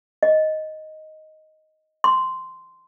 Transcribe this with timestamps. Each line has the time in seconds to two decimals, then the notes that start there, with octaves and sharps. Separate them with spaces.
0.23 D#5
2.04 C6